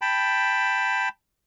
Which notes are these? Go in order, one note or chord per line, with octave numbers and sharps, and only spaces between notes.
G5 A5 B5